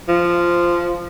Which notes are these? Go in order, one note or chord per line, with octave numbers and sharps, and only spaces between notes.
F3